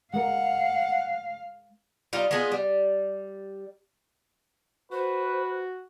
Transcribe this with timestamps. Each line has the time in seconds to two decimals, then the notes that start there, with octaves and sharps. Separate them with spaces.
0.14 G#3 A#4 F5 F#5
2.13 G3 D#4 F4
2.31 G#3 B3 F4 G#4
2.52 G3
4.92 F#4 B4 C5